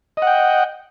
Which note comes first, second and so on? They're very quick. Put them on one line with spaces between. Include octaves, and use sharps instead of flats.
D#5 F#5 G5